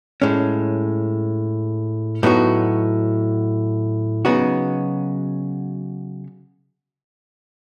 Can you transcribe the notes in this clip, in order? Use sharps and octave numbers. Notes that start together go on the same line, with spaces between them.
A2 G#3 C#4
A2 F#3 B3 D#4 F#4
C#3 F#3 B3 D#4 F#4